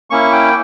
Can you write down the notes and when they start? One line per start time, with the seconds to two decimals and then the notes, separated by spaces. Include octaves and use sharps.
0.10 A#3 C#4 E4 C#6
0.32 G5